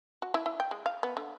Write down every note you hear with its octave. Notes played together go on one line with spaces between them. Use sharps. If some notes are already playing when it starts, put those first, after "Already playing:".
F#4
E4
E4
G5
G#3
F5
B3
D3